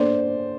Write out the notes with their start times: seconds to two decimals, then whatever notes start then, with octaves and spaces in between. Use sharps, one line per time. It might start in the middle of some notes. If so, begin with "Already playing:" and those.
Already playing: A#3 D4 A4 C5 D5